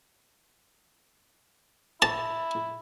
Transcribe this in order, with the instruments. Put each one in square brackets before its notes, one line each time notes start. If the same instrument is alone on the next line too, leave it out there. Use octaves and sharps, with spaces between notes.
[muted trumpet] E4 [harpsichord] A5